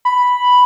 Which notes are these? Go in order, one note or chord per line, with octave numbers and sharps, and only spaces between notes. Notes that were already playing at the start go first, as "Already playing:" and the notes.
B5